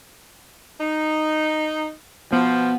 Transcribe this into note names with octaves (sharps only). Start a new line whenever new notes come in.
D#4
B2 F3 B3